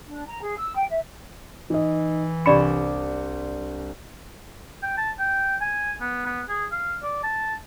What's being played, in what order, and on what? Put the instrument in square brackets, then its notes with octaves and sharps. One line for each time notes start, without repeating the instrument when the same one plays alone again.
[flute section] D4
A#5
G#4
E6
G5
E5
[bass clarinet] E3 [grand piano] D#4 D#5
[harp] C2 D4 E7 [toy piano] G4 D5 B5 [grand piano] C#7
[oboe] G5
A5
G5
G#5
B3
B3
G#4
F5
D5
A5